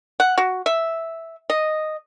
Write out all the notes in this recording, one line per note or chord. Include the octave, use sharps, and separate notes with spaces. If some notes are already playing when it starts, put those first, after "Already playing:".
F#5
F#4
E5
D#5